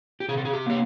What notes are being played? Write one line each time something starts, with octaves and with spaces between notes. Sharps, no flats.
G4
C3 G#4
A4
G#4
G4
A#3 G4